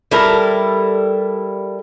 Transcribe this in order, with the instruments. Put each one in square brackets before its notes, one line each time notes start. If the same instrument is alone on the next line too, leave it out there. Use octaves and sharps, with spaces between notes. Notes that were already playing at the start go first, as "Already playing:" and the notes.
[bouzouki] G3 E4 A4 A#4